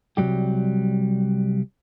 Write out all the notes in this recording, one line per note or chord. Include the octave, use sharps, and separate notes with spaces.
C2 F2 F#3 G3 G4